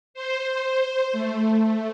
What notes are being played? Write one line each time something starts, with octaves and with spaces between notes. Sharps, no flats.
C5
A3